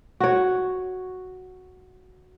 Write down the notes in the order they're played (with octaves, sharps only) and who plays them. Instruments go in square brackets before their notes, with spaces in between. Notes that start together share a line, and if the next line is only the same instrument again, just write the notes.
[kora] F#4 C#5